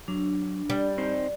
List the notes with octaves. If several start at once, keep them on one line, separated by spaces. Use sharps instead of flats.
F#3 D4
G3 D5
C4 D#4 C5